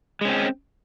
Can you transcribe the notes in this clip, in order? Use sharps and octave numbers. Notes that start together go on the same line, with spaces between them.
G#3 C4 C#4